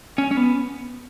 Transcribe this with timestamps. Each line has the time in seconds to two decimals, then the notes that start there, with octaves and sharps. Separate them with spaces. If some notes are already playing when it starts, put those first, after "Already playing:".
0.18 C#4
0.31 C#4
0.37 B3